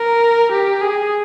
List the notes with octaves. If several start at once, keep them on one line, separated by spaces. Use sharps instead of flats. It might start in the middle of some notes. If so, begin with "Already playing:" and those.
Already playing: A#4
G4
G#4